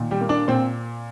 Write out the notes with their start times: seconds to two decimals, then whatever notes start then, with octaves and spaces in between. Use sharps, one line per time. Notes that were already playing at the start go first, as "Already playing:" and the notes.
Already playing: A#2 D#3
0.11 G3 G4
0.21 A#3
0.29 D4 D5
0.48 A#2 C4 C5